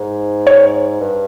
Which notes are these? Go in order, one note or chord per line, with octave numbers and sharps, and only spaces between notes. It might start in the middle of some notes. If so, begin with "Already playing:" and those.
Already playing: G#2
C#5
G2